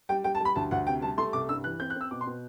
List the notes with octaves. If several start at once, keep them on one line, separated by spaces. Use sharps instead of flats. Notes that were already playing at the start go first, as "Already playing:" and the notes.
G3 G5
G3 G5
A5
G3
B5
D2 A5
D2 F#5
C3 G5
G3 A5
A3 C6
C2 D6
G2 E6
E3 F#6
C4 G6
F#6
C4
E6
B2 D6
C6
B2